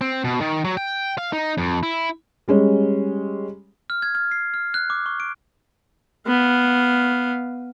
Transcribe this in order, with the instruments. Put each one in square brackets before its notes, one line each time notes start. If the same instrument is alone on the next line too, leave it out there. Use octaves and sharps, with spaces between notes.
[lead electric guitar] C4
B2
D#3
F#3
G5
F5
D#4
F2
E4
[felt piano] G3 G#3 C#4
[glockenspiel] F6
G#6
F6
C7
F6
F#6
D6
C#6
D7
[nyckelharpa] B3 F5